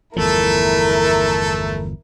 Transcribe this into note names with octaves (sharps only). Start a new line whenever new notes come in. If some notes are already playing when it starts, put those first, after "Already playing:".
G1 E2 F3 A3 E4 A4 A#4